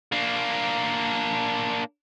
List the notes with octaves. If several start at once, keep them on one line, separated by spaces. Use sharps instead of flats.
A#3 D4